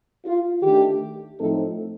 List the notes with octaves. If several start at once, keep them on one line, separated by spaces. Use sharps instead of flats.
F4
D#3 A3 D4 G4
A2 F3 A3 C4 D#4 A4